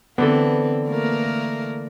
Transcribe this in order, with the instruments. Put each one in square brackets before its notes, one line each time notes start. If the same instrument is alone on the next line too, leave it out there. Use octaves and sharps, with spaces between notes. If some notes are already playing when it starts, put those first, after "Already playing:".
[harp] D3 E3 A4 [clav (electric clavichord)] B3 [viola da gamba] C4
[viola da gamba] A3 A#3 A#4